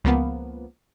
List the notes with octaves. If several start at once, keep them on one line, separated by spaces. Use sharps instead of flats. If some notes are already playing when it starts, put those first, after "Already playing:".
C#2 F3 A#3 B3